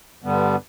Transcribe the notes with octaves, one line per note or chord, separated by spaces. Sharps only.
G2 D3 G3 B3